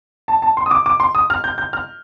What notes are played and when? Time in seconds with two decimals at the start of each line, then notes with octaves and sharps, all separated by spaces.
0.28 A5
0.42 A5
0.57 C6
0.66 D#6
0.71 D6
0.86 D6
1.00 C6
1.15 D#6
1.30 F6
1.44 G6
1.58 G6
1.73 F6